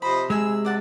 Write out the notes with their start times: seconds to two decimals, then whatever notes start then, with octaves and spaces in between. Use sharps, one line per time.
0.02 C3 F3 C5 D#5 B5
0.30 G#3 G#4 A4 G#5 E6
0.65 D5 F#5 A5